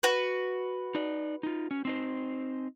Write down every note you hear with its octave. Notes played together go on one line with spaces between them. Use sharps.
F#4 B4
D#4 D5
D#4 F4
C#4
C4 D#4 C5